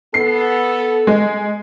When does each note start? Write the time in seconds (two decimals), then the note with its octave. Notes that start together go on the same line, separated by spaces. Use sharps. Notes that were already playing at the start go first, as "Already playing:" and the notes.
0.14 B3 A4 C7
1.07 G#3